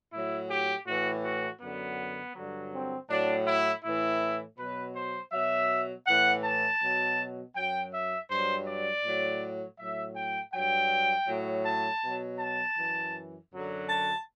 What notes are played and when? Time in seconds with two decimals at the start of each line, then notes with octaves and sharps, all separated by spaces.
0.12 A2 F#3 E4
0.49 G4
0.86 A2 E3 F#4
1.24 F#4
1.61 F#2 D3 F#3 B3
2.35 G2 D3 F#3
2.73 C4
3.09 A2 F#3 D4
3.47 E4
3.84 A2 E3 E4
4.58 B2 F#3 B4
4.95 C5
5.32 B2 F#3 E5
6.07 A2 E3 F#5
6.44 A5
6.81 B2 F#3
7.56 F#2 F#3 G5
7.93 E5
8.30 G2 F#3 C5
8.67 D5
9.04 A2 F#3
9.79 A2 F#3 E5
10.16 G5
10.53 G2 F#3 G5
11.27 A2 F#3
11.65 A5
12.03 B2 F#3
12.39 A5
12.76 F#2 E3
13.51 F#2 D3 F#3
13.88 A5